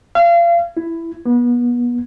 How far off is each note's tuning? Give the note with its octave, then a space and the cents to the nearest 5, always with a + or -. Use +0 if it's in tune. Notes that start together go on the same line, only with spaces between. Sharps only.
F5 -30
E4 +10
B3 -30